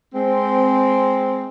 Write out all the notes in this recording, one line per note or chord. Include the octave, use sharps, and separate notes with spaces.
G#3 C4